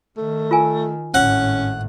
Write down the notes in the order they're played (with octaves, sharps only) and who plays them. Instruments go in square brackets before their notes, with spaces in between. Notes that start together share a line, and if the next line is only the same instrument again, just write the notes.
[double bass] D#3 [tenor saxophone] A3
[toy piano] F4 A#4 G#5
[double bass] G#1 A2 [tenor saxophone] C#4 [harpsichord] F#5